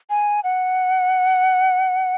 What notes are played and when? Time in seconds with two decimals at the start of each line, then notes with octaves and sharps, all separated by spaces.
0.10 G#5
0.44 F#5